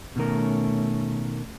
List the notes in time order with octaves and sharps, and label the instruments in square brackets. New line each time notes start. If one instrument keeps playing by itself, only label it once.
[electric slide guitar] B2 D#3 A#4 [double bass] A3 C#4